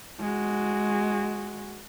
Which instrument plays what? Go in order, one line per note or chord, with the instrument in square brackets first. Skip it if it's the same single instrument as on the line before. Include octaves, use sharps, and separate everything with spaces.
[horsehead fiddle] G#3 F#4